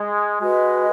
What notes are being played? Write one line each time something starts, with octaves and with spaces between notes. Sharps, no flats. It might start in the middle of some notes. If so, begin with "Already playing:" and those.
Already playing: G#3
G#3 F#4 B4 D#5